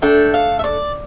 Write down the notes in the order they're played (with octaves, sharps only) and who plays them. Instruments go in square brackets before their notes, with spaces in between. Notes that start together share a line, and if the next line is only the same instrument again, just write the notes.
[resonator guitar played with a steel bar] A3 D4 A4 [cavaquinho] G5
[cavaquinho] F5
E5
D5